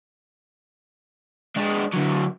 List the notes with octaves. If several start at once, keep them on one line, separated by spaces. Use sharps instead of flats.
G#3 D4
D3 F#3